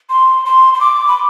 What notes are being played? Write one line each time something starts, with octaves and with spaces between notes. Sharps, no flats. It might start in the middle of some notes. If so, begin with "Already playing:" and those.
C6
C6
C6
D6
B5